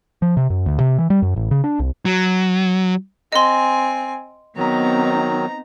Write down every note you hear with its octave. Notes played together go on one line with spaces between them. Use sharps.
F3
C3
F#2
D2
C3
E3
G3
F#2
A1
C#3
D4
C2
F#3
C4 D#5 G#5 C6
D#3 F#3 B3 C4 D#4 A#5